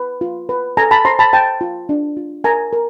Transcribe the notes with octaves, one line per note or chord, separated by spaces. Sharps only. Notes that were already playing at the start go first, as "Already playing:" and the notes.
Already playing: B4
F4
B4
A4 G#5 A#5
A5 B5
C5 A#5 C6
A5 B5
C5 G5 A5
F4
D4
F4
A#4 G#5 A#5
A#4